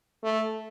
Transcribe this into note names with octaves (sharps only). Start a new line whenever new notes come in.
A3